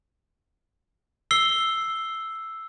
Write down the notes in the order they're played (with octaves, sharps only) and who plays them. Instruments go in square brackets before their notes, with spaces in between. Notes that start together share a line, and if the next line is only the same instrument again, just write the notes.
[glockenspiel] E6 C7 G7